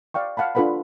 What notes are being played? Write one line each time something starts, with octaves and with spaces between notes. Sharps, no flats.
D5 F5 G5 C#6
F5 F#5 A5 B5
D4 F4 A4 B4 F#5 B5